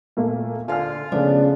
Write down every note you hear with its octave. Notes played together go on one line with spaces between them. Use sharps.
A#2 A3 A#3
D3 F4 F5 G#5 F6
C#3 F3 A3 B3 D4